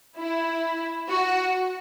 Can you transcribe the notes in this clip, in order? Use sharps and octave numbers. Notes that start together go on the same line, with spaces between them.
E4
F#4